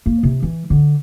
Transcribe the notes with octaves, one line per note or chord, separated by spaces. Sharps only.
A#3
C3
E3
D3